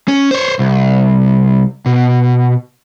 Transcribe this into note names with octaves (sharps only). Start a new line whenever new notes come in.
C#4
C5 C#5
C2
B2